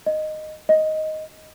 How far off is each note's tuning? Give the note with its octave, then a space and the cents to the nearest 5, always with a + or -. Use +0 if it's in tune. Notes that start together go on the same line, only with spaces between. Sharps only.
D#5 -10
D#5 +5